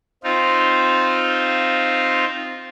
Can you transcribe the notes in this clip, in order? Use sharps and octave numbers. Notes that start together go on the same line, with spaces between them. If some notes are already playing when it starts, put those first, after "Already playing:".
C4 D#4 F4